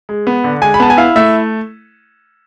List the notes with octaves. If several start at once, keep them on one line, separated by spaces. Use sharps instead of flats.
G#3
B3
D3
G#3 G#5
B5
B3 A5
G#5
E4 F5
A3 E5